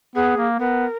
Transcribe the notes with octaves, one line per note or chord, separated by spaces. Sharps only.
B3 G#4
A#3
B3 A#4